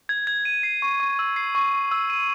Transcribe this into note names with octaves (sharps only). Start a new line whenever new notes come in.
G#6
G#6
D#7
C7
C#6
C#6
E6
C7
C#6
C#6
E6
D#7